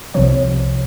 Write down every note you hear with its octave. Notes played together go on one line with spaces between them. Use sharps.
C2 C3 F3 C#5